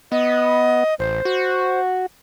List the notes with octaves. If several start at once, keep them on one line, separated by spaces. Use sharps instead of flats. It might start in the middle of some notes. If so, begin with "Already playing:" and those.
B3 D#5
A1 C5
F#4